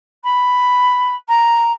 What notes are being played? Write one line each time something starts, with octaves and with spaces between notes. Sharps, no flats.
B5
A#5